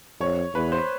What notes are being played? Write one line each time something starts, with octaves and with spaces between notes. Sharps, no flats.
F2 C#5
E2 B4
C5